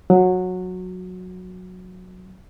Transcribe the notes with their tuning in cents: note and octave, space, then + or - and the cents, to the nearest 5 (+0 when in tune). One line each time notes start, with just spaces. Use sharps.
F#3 -15